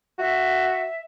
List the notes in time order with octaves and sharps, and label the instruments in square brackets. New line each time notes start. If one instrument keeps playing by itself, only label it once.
[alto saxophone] F#4 [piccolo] E5